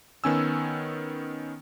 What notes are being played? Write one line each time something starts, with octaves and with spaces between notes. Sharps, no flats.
D#3 B3 C#4 G#5 E6